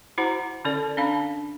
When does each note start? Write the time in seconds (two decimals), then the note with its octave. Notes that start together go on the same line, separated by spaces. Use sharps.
0.18 E4 F#4 C5 F#5 A#5
0.65 D3 C#4 A4 D5
0.97 C#4 D4 F5 B5